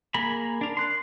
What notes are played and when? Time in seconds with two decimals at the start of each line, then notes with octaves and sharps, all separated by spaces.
0.14 A#3 G#4 A#4 B5
0.61 D4 A#4
0.77 C6 F#6